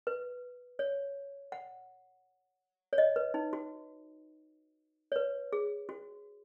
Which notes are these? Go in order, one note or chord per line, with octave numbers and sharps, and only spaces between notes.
B4
C#5
F#5
C#5
D#5
B4
D#4
F#4
C#5
B4
G#4
F#4